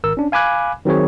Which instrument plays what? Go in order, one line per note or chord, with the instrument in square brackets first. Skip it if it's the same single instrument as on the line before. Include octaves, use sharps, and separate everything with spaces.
[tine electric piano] G#1 A#4 E6
C#4 D4
F5 G#5 B5 D6 F#6 G#6
D#3 F#3 C4 G#4 C#5